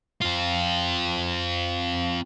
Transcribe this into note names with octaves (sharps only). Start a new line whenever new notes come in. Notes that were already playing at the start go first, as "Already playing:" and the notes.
C4 F4